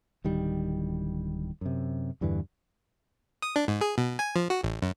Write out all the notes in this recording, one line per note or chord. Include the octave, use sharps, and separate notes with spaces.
D1 D#3 G3
F#2 C3
E2 G2 D3 E3
D#6
D4
G#2
G#4
B2
G#5
F3
F#4
A1
F#2